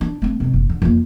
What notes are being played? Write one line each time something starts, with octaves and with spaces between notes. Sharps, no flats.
D4
A3 C4
G#2 C3
F#1
D3
F2 A#3